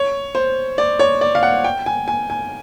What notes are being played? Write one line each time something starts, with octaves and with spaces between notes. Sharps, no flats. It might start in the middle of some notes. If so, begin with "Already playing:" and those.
Already playing: C#5
C5
D5
C#5
D5
F5
F#5
G5
G#5
G#5
G#5